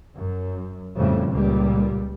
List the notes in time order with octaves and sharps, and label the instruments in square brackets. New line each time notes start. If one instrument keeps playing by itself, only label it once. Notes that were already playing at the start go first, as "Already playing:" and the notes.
[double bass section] F#2
F2 A2 C#3 G3
C#2 A#2 G3